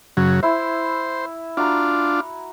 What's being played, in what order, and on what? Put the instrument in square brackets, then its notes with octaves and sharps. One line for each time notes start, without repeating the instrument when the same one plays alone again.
[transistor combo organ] F#2 C#3 F#3
[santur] E4 E5 [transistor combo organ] C5
[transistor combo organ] D4 F4 [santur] F#4 A#5